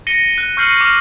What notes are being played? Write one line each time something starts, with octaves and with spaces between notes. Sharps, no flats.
A#6 C#7 D#7 G7
F#6 D#7
C#6 F6 G6 C7 C#7 F#7
D6 F6